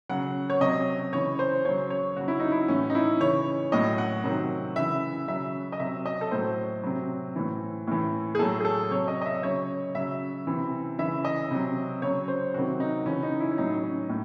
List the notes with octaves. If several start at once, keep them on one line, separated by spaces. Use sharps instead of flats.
C#3 F#3 F#5
C#5
C3 F#3 D#5
C#3 E3 C#5
C5
C#3 F#3 C#5
C#5
C#3 F#3 F#4
E4
D#4
E4
A2 E3 C#4
D#4
E4
C#3 E3 C#5
A2 F#3 D#5
F#5
C3 D#3 F#3
C#3 E3 E5
C#3 F#3 E5
D#5
C3 F#3 E5
D#5
A4
A2 F#3 C5
C3 F#3
A2 E3
A2 E3
G#4
A2 F#3 A4
G#4
A4
C3 F#3 C#5
D#5
D#5
E5
C#3 F#3 C#5
C#3 F#3 E5
C3 E3
C#3 E3 E5
D#5
C3 F#3
C#3 F#3 C#5
C5
C3 D#3 F#3 F#4
D#4
C#3 E3 C#4
D#4
E4
C#4
A2 F#3 D#4
C#4
A2